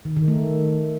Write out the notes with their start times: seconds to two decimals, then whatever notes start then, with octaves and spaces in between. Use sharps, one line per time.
0.05 D#3
0.17 D#3
0.28 A3